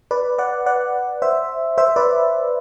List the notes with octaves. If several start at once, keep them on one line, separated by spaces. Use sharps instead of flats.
B4 D5
D5 F#5
D5 F#5
C5 E5
C5 E5
B4 D5